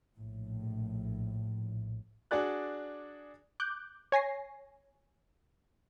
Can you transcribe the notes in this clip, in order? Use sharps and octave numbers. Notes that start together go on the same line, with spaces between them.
A#1 A2
D4 F#4 G#4 D5 F#6
D6 F#6 G6
C#5 G#5 A#6 C7